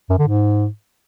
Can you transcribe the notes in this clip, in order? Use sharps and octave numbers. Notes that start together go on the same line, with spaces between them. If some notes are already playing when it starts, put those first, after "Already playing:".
F#2
D3
G#2